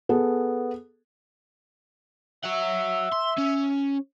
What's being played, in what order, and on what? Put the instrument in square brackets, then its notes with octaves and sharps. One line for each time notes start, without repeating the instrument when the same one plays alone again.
[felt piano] B3 G#4 A4
[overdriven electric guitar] C#5 F#5 [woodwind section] E5
[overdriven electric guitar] C6
C#4